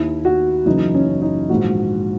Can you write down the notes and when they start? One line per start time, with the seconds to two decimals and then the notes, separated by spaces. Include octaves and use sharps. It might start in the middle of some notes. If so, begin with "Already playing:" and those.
Already playing: D#2 D#3 E4
0.25 F#4
0.66 F#1 F#2 E3 D#4
0.95 C#4
1.22 D#4
1.49 A#1 G#2 D#3 F#4